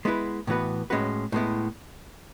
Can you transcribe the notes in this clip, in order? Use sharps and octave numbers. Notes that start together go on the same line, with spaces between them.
G#3 B3 E4 B4
A2 E3 B3 F#4 B4
A2 G#3 C#4 F#4 B4
A2 G#3 B3 E4